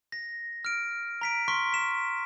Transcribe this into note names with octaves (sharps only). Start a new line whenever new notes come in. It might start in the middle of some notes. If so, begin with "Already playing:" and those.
A#6
F6 D7
A#5 B6 D7
C6 C#6 F6 B6
B6 E7